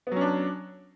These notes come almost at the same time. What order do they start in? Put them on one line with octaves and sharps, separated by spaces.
B3 F#3 C#4 D4